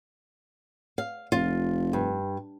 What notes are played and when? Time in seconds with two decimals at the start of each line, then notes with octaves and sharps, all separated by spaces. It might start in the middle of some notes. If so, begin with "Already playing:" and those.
0.98 F5
1.32 F1 F4
1.93 G2